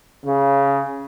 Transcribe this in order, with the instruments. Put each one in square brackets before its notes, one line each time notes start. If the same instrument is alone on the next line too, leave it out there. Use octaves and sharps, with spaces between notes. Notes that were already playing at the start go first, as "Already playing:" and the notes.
[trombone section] C#3